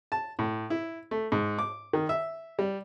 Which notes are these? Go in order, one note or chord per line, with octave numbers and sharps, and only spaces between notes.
A5
A2
E4
A3
G#2
D6
D#3
E5
G3